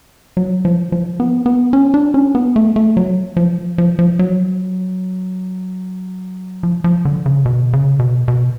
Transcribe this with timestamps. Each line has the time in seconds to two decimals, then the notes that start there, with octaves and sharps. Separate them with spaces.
0.37 F#3
0.65 F3
0.92 F3
1.20 B3
1.46 B3
1.73 C#4
1.94 D4
2.14 C#4
2.35 B3
2.56 A3
2.76 A3
2.97 F#3
3.37 F3
3.78 F3
3.99 F3
4.19 F#3
6.63 F3
6.84 F3
7.05 D3
7.26 C#3
7.46 B2
7.73 C#3
7.99 B2
8.28 B2